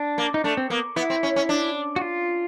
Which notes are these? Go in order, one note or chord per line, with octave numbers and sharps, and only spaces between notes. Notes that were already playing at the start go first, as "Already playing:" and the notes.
Already playing: D4
A#3
D#4
A3 D4
C4
A#3 B3
B3 E4
C4
C#4
C#4
D4
F#4
F4